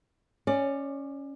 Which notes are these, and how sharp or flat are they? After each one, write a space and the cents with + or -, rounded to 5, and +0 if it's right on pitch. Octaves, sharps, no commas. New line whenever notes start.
C#4 +0 D5 +25